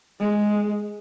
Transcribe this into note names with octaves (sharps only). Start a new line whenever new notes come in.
G#3